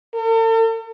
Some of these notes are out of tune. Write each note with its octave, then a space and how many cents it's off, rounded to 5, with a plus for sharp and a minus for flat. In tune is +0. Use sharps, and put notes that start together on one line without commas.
A4 +45